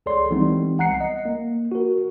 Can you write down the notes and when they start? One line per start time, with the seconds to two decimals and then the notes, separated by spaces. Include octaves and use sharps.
0.06 C#2 G#4 A4 C#5 D5 C6
0.31 E3 G3 G#3 B3 C4 D#4
0.79 C2 F#5 A#5 F#6 C7 C#7
1.01 D#5
1.25 A#3
1.72 F#4 A#4